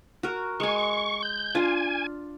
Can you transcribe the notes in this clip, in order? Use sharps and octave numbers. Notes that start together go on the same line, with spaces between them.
F#4 A#4
G#3 G#5 C#6
G6
D4 F4 G#5